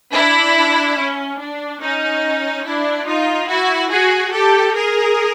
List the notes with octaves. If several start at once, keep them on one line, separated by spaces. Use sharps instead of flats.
D4 E4
C#4
D4
C#4 D#4
D4 E4
D#4 F4
E4 F#4
F#4 G#4
G4 A4
G#4 A#4